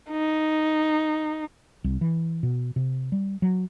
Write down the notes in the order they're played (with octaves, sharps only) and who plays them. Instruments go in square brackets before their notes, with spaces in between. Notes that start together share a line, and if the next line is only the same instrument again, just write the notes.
[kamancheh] D#4
[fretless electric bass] C2
E3
B2
C3
G3
F#3